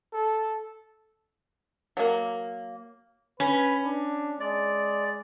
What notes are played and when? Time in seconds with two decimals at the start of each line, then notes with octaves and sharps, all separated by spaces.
0.14 A4
1.97 F#3 A#3
3.40 C#4 B4
3.85 D4
4.40 G#3 D5